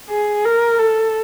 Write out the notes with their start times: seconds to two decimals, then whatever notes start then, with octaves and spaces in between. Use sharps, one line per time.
0.10 G#4
0.45 A#4
0.79 A4